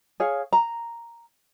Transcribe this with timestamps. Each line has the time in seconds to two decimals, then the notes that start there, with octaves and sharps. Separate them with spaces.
0.20 G#4 C#5 F5
0.53 A#5